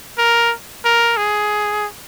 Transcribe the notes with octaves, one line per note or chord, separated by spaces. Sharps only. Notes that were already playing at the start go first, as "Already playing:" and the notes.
A#4
A#4
G#4